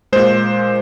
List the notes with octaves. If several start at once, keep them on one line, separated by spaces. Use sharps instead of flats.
A#2 G#3 C5